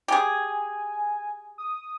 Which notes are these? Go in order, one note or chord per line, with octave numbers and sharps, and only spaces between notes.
G4 G#4 G#5
D#6